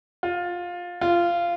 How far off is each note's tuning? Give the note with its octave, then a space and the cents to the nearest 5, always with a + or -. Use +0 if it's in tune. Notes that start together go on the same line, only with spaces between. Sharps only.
F4 +15
F4 -15